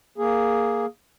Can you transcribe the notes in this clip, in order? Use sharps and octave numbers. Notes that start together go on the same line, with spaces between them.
A#3 G#4